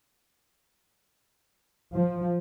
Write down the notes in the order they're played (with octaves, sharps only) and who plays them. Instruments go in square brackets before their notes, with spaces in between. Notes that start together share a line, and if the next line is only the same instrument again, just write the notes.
[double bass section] F3